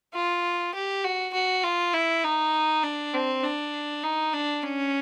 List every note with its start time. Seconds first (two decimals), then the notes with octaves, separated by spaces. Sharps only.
0.14 F4
0.74 G4
1.04 F#4
1.33 F#4
1.63 F4
1.93 E4
2.24 D#4
2.83 D4
3.13 C4
3.43 D4
4.03 D#4
4.33 D4
4.63 C#4